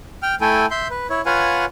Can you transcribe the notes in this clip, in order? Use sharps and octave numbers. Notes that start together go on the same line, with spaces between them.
G5 F6
A3 E4 A4 G5 G#5
E5 C6 G6
B4
E4 C#5
F4 B4 C#5 F5 F#5 G#5